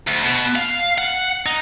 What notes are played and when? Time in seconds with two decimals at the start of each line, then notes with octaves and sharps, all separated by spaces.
0.08 D2
0.24 B2
0.56 F5
0.98 F#5
1.46 D#4